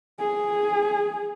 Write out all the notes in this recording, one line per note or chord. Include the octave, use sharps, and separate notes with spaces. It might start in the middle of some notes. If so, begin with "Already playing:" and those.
G#4